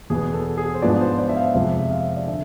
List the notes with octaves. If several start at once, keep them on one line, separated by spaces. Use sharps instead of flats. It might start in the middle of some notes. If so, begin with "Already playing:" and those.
E2 B2 B3 G#4
A4
G#4
C5
G#2 F3 B3 D4 D5
C5
D5
E5
F5
F2 C3 F3 G#3 E5
E5
F5
D5
D3 E5